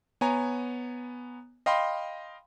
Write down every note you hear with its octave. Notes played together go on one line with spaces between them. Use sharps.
B3 C#5 G#5 A#5
D#5 F5 G5 B5 C6